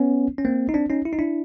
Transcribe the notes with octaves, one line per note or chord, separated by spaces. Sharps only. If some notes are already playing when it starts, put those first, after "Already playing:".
Already playing: B3 C#4
C#4
A#3 C4
D#4
C4 D4
C#4 D#4
E4
D#4
D4 E4